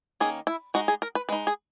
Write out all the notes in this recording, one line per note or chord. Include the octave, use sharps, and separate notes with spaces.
D#3 A#3 C#4 G#4
E4
G#3 D#4 F#4
G#4
A#4
B4
G#3 D#4 B4
G#4